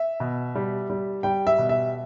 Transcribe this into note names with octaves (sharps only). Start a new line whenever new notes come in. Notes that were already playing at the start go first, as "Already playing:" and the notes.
Already playing: E5
B2
G3
G3
G3 G5
E5
B2
E5